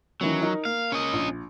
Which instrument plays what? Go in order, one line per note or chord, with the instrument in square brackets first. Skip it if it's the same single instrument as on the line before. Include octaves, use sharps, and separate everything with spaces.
[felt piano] D#3 E3 C#4 [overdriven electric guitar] F#3
[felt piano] D#4 A#4
[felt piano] A#3 [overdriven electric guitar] F5
[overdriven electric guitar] C#4 D#5
[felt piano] A#1